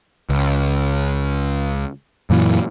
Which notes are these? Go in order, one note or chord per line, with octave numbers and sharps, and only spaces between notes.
C#2
F#2 A#2 E3